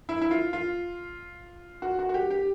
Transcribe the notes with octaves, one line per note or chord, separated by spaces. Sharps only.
E4
E4
F4
F4
F#4
F#4
F#4
G4
G4